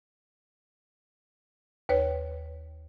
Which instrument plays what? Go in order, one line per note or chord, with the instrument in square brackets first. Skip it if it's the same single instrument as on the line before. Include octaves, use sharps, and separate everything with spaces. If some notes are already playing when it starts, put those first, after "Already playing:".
[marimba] D#2 B4 C#5